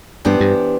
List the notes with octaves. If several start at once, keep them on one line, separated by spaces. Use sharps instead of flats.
G2 E3 B3 D4 G4 C5
G2